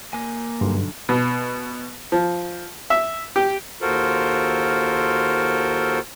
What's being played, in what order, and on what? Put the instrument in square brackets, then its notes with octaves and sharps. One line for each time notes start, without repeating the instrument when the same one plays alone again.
[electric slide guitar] A#3 G#5
[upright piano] B1 D3 C6 [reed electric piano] G2
[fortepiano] B2
F3
E5
G4
[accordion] D#2 F4 F#4 A4 A#4 C5